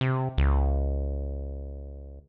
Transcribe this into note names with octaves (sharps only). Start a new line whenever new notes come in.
C3
C#2